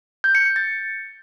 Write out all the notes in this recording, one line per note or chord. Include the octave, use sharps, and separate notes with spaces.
G6
C#7
C#7
A6